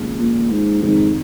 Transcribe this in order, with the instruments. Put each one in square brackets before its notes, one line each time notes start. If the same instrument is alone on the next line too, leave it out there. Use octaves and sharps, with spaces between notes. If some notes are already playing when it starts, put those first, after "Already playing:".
Already playing: [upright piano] F1 D#2 C#3 F3 G#3
[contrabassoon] A#2
G#2
[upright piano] F1 F2 D#3 [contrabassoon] G#2